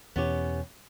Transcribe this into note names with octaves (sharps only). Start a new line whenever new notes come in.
E2 B2 B3 C#4 G4